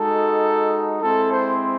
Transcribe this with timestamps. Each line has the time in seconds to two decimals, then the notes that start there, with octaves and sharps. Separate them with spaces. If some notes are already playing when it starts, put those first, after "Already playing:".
Already playing: G#3 D#4 F#4 A4
1.01 G#3 C4 E4 A4
1.30 C5